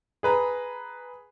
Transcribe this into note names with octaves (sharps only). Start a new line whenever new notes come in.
G#4 B4 A#5